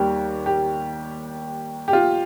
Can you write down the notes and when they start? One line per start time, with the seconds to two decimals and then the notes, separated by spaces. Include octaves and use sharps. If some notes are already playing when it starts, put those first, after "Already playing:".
Already playing: D#2 D#3 G3 G4
0.46 G4
1.88 G4
1.93 F4